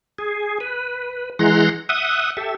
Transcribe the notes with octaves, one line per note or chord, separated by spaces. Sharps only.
G#4
B4
E3 G#3 F#5 A#5 C6
E5 F#5 D#6
G4 A4 E5